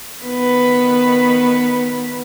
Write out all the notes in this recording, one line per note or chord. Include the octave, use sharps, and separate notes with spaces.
D#3 B3 B4